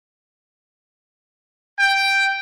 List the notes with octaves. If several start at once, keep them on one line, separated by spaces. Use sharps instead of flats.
G5